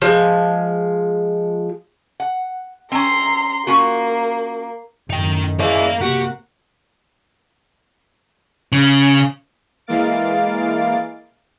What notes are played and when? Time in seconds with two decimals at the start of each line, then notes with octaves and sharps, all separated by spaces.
0.02 F3 G#3
2.20 F#5
2.92 C4 C#4 A#5 C6
3.67 A#3 C#4 F4 F#4
5.10 F#2 A2 D#3 D#4 G5
5.59 E3 G#3 A#4 D5 F5
6.01 C3 A#3 F#4 G4
8.72 C#3
9.87 E3 G#3 A#3 F5 A6 D7